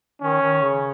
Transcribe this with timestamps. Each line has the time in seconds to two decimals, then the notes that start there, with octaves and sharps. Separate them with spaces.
0.22 D#3 C#4
0.41 D#3
0.62 C#3